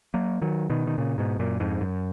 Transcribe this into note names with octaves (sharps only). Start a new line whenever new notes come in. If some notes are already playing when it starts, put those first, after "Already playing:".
F#3 A#3
D#3 F#3
B2 D#3
D#3
A#2 C#3
G#2 B2
F#2 A#2
F2 G#2
F#2